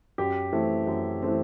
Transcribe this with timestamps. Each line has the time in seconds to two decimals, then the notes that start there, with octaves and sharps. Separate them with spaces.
0.18 F#2 G4
0.53 E3 A3 C4
0.87 F#2
1.22 E3 A3 C4